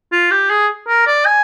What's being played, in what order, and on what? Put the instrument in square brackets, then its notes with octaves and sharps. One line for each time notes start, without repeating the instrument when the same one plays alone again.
[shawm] F4
G4
G#4
A#4
D5
G#5